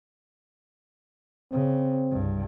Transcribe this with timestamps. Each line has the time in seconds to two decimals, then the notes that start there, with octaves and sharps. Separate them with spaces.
1.52 C#3 C4
2.11 C2 G2